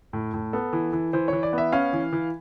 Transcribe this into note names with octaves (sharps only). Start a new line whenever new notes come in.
A2
A2
B3 A4
E3
E3
E3 C5
E3 C#5
D5
B3
E5
C#4 F5
E3
E3